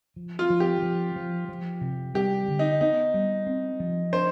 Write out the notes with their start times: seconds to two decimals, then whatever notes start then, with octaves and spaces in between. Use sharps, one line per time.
0.16 F3
0.39 F4
0.50 F3
0.60 G4
0.83 F3
1.16 F3
1.49 F3
1.81 C3
2.15 G3 G4
2.48 D3
2.59 D#4
2.81 B3 D#4
3.14 G3
3.47 C4
3.80 F3
4.13 D4 C5